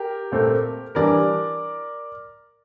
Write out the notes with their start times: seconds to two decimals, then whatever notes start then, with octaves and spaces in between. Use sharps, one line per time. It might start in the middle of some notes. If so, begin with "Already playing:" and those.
Already playing: G4 A#4
0.32 A#2 A3 C4
0.95 E3 G3 D4 A#4 D5